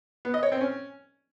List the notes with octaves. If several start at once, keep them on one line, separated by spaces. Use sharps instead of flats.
B3
D#5
C#5
C4
C#4